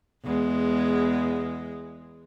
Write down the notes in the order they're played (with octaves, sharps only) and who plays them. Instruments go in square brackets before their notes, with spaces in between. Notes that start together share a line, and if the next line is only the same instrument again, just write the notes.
[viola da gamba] E2 G#3